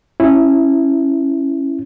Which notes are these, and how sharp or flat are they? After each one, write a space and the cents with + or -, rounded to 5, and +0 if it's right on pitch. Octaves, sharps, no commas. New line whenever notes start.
C#4 -15 E4 +0